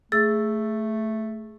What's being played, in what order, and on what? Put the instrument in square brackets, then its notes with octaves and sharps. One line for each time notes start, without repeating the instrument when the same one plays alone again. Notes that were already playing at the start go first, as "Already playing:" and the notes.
[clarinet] A3 [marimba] G#4 E6 A6